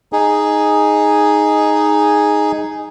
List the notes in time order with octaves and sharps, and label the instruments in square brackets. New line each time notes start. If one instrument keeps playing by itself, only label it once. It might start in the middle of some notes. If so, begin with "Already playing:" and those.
[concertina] D#4 G#4